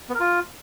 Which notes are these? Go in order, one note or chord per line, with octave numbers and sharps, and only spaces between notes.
B3
A#4
F4